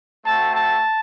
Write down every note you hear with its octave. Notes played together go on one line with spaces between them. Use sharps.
A3 C4 F#4 A5
A5